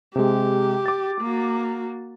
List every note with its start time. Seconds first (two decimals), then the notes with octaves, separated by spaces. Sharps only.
0.16 C3 G#3 G4
0.86 D6 A6
1.21 A#3 F#4